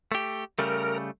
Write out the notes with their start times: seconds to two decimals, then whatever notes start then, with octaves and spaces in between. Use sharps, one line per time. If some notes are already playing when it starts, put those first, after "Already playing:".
0.12 A3 G4
0.59 C#3 G3 A3 A#4